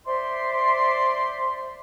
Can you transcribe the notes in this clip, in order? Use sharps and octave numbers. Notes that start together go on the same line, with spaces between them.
C5 D5 E5 C6